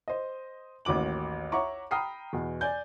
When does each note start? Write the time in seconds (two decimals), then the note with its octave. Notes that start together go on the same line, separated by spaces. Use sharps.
0.08 C5 D#5
0.85 A1 D#2 F#4 D6 F#7
1.52 C#5 E5 F#5 A#5 C#6 D6
1.91 G5 A#5 B5 D#6 F6 C7
2.33 E2 B2
2.61 D5 G#5 G6